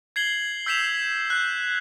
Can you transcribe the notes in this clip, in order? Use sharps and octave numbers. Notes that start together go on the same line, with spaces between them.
G#6 C7 F#7 G7
E6 G6 B6 C7 E7 F7
F#6 G6